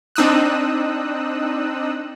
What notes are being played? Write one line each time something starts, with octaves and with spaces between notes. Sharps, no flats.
C4 D4 D#4 D#6 E6 F#6